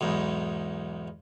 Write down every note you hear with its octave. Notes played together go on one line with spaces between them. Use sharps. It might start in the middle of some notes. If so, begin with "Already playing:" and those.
B1 E2 G#2